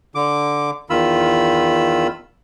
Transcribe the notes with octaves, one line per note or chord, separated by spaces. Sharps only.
D3 D6
E2 D#3 F4 B5 E6